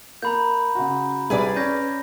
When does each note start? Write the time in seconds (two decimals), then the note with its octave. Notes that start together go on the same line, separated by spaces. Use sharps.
0.22 A#3 A#5 B5 G6
0.75 C#3 F#4
1.30 C2 G3 G#4 B4 D5
1.56 C#4 G6 A#6